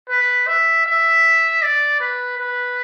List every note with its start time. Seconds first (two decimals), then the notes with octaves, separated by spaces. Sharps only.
0.09 B4
0.47 E5
0.86 E5
1.62 D5
2.00 B4
2.38 B4